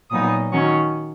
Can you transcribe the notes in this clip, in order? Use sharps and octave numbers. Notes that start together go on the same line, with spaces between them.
A#2 F#3 B3 D#4 D#6
D#3 F#3 C#4 C#6